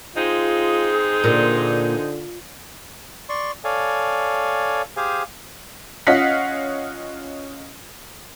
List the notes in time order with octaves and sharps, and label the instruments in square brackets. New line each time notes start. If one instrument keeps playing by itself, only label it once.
[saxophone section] G#3 C4 D#4 [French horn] F4 [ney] G#4
[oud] A#2 [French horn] D3
[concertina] D5 C6 C#6
A4 C#5 D5 F5 G#5
G4 G#4 C5 F5 G#5
[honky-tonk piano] C#4 F4 D#5 F5 F#5 B6